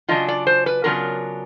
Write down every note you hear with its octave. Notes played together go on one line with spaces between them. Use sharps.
C#3 F#3 B3 D4 F4 D#5
D5
C5
B4
C#3 F#3 B3 D4 F4 A#4